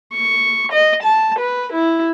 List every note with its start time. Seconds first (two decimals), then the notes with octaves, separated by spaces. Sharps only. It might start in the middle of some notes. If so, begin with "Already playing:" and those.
0.13 C#6
0.72 D#5
1.03 A5
1.39 B4
1.73 E4